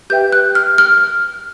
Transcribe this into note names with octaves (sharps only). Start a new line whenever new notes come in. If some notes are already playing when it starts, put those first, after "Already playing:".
G4 B4 E5 G5 G6
F#6
F6
F6